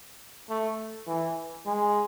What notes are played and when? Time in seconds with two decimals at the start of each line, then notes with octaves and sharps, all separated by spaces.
0.49 A3
1.07 E3
1.66 G#3